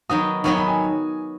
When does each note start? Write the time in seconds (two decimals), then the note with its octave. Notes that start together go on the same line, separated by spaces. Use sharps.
0.10 D#3 F#3 B3 D#4 F#4 D#6
0.44 D#3 F#3 B3 D#4 F#4 C#6
0.57 B5
0.68 G#5